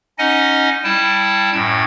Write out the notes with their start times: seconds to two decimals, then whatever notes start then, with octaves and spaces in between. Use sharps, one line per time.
0.19 C#4 D#4 D#5 F#5 G#5
0.84 G3 E4 G5 A5
1.54 F#2 A2 G5 G#6